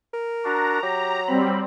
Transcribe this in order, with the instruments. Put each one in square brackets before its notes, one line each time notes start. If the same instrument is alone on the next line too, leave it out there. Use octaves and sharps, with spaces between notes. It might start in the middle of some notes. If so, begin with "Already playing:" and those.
[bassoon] A#4
[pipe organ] D4 F#4 [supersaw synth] A#5
[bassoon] F#3 [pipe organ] G4
[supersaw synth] G3 C4 [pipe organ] B5